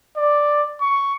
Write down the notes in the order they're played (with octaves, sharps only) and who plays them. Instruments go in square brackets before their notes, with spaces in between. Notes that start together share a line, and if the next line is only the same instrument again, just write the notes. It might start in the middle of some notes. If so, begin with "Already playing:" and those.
[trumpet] D5
C#6